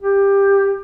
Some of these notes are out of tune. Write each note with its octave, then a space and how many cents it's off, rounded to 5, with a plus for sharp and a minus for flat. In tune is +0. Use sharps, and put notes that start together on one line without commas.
G4 +15